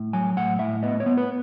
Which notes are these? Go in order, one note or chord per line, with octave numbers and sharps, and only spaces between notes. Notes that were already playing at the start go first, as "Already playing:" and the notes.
Already playing: A2
F#3 G#5
A2 F#5
A2 E5
B3 D#5
C#5
B3
B4